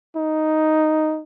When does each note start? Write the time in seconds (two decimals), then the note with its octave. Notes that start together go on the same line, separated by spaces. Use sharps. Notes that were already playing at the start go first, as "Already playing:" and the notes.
0.16 D#4